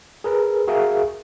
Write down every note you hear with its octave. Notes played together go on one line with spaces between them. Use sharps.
G#4 A#4 B4
F#4 G#4 A#4 E5 F5